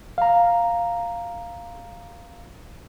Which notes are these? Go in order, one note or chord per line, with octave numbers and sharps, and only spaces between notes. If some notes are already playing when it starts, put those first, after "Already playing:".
F5 A#5